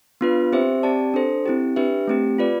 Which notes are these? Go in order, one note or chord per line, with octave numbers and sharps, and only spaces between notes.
B3 D4 F4 B4
C4 G4 C5 E5
C4 G4 D5 A5
D4 A4 C5
C4 E4 G4
D4 G4 B4 E5
A3 C4 G4
F4 B4 D5